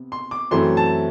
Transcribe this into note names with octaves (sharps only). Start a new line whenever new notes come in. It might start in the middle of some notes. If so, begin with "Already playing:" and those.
Already playing: C3 B3
C6
D6
F#2 E3 A3 C4 C6
A5